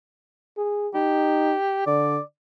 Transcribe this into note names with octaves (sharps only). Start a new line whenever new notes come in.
G#4
D#4 G4
D3 D5